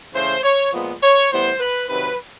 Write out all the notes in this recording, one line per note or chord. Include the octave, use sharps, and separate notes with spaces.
C#3 E3 A3 C5
C#5
A#2 F3 G#3 B3
C#5
A2 E3 G3 B3 C5
B4
C3 D#3 F#3 B4